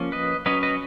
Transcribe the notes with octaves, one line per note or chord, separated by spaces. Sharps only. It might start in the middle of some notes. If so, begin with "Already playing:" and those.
Already playing: F3 A#3 C#4
B4 D#5
F#3 C#4 B4 D#5
B4 D#5